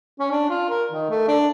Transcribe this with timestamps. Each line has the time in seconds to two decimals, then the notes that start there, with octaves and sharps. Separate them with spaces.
0.19 C#4
0.31 D4
0.49 F4
0.69 A#4
0.92 D#3
1.10 A3
1.28 D4